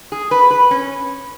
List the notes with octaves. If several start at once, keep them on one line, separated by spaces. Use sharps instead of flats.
G#4
B4
B4
C#4